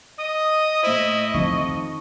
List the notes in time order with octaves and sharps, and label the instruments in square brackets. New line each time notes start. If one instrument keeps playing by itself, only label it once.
[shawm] D#5 [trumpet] D#6
[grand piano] A2 C5 [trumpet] E4
[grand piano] F2 [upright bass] D#3 [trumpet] C#6